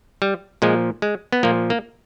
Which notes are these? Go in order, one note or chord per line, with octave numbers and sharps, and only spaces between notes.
G3
A#2 F3 G#3
G#3
B3
A#2 F3 A#3
A#3